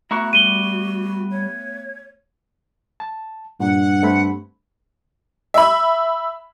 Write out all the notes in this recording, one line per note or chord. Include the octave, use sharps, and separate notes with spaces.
A3 B3 E4 F#4 A#5 C#6 F#6
G3 D#7 G7
C#5
A5
G2 A#2 F#5
A3 C4 B5
E5 B5